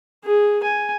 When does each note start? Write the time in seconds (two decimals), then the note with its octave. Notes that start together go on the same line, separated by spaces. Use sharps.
0.25 G#4
0.63 G#5